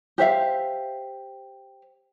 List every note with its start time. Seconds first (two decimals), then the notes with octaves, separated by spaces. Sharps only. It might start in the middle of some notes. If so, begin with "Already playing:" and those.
0.18 G4 C5 E5 F5